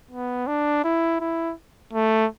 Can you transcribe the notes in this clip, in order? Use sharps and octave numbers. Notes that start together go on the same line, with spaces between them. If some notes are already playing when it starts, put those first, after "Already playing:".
B3
D4
E4
E4
A3